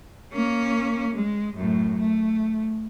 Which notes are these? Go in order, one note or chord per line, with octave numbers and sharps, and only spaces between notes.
A#3 C#4
G#3
F#2 A2
A3